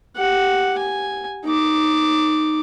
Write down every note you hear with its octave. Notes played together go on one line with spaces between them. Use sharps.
G4 F#5
G#5
D#4 D6